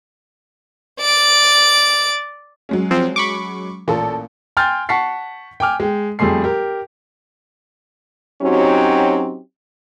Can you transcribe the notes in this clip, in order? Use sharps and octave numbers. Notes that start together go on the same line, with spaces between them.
D5 D7
F#3 G#3 C#4
F3 C4
B5 C#6 D6
A1 A#2 A4
G5 G#5 C6 F6 G6 A6
F#5 A5 C#6 B6 C7
G5 G#5 D6 F6
G#3 G5
F2 G3 A3 G#4 C6 C7
G4 A#4
F#3 C4 C#4 D#4 F#4 G4